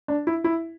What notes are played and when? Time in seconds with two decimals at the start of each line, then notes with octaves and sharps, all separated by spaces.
0.08 D4
0.27 E4
0.44 E4